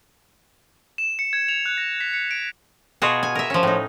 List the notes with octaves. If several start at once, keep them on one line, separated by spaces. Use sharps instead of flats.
E7
C#7
G#6
F7
F#6
A#6
B6
C#7
D7
B2 F4 F#4 G#4
G#5
A#4 E5
F3 C#4
A2 D#4